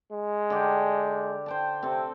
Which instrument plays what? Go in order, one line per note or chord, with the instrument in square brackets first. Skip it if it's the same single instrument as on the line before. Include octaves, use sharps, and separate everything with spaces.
[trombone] G#3
[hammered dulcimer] D3 G4
C5 G5 A5
[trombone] C3 [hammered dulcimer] C4 A4